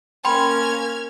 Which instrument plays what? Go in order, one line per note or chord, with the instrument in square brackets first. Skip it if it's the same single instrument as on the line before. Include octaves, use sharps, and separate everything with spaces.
[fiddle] A#3 C#4 [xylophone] G5 B5 [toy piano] C6 [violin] F6 G#6